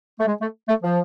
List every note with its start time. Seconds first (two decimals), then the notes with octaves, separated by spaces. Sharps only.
0.19 A3
0.27 G#3
0.41 A3
0.68 A3
0.83 F3